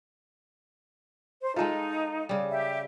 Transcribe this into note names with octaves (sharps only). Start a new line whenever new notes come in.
C5
G#3 D#4 F4 A4 A5
C#3 G3
G4 E5